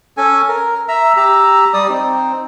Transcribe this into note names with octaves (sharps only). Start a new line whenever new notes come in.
C#4 A4 G#5
A#4
E5 A#5 E6
G4 A#5 E6
G3 D5 D#6
C4 D#4